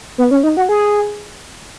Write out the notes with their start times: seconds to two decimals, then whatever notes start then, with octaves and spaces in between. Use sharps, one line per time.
0.18 B3
0.31 C#4
0.43 D#4
0.57 F#4
0.69 G#4